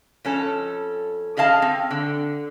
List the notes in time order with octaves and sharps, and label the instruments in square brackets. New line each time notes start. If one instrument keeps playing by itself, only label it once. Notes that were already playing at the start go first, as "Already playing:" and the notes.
[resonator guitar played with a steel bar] F2 C#4 A4
C#4 G#4 D#5 F5 A5
C4
D3